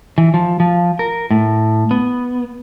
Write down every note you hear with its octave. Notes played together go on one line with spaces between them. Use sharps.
E3
F3
F3
A#4
A2
B3